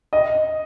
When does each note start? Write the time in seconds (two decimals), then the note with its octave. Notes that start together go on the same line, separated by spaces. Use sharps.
0.13 D#5